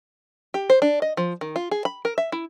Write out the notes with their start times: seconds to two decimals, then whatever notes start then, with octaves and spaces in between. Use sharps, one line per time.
0.54 G4
0.70 C5
0.82 D4
1.02 D#5
1.17 F3
1.41 D#3
1.56 F4
1.71 G#4
1.85 B5
2.05 A#4
2.18 E5
2.32 E4